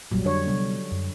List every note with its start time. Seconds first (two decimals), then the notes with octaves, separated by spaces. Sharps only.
0.12 F1 A#1 A#2 F#3 G3
0.25 F2 D3 D4 C#5
0.47 C3 G3 B3
0.92 F#2